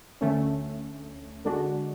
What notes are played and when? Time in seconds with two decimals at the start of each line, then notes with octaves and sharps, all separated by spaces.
0.21 D2 D3 A3 C#4
1.45 D3 G#3 D4 F#4